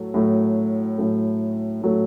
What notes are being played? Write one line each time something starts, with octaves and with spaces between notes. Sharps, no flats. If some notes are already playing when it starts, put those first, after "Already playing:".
Already playing: A2 F#3 A3
A2 F#3 A3
A2 F#3 A3
A2 F#3 A3